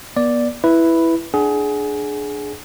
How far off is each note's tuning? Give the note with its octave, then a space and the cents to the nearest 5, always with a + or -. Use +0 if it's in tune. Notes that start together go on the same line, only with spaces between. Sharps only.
B3 -30 D5 +0
E4 +0 B4 +0
D4 +10 G#4 +20 F#5 +35